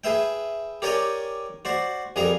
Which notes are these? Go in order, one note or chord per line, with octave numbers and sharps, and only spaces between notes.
G#4 B4 E5 G5
G4 A#4 C#5 D5 G5 G#5
F#4 C5 D5
F2 G3 G#4 A#4 A#5